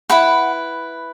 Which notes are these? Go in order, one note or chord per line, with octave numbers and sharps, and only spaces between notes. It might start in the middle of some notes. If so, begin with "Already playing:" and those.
E4 B4 F#5 B5